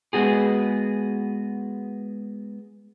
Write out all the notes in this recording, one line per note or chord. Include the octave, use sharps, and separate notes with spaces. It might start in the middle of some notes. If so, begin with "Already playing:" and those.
G#3 B3 F#4 G#4